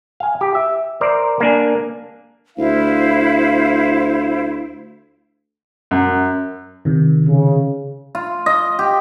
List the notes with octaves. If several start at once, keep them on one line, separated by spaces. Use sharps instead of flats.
F5 G#5
G4
E5
A#4 C5 D5
A#3 D4 G#5
D2 E4 C5 F5
F#2
C3 D#3
C#3
F4
D#5
G4